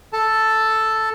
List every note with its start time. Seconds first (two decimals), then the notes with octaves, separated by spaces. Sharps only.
0.13 A4 A5